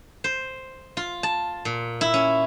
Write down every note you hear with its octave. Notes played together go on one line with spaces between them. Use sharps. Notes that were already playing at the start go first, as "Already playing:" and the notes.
C5
F4
A5
A#2
E4
C#4